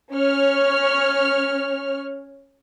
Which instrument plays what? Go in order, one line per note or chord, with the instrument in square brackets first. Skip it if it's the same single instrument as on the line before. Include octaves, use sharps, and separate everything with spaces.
[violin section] C#4 C#5 F6